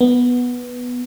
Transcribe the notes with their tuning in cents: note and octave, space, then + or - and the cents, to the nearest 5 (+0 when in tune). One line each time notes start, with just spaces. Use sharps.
B3 -5